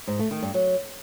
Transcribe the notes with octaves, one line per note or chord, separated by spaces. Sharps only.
G#2
A3
D#3
G2
F#3